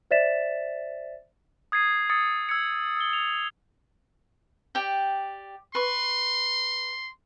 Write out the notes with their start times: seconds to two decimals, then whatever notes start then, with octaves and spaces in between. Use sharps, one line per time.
0.11 C5 D5 E5 A6 B6 E7
1.72 D#6 G#6 A6 C7 D#7
2.10 D#6 E6 G#6 A6 C#7
2.49 E6 G#6 C#7
2.97 E6 G7
3.13 F7
4.75 G4 D5 G5
5.75 B4 C6 C#6